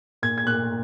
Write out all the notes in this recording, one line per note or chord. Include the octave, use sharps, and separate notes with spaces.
A#2 G#6
G#6
A#2 F#6